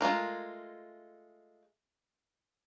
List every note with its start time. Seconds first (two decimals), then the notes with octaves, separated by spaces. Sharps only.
0.01 G#3 A3 F4 A#4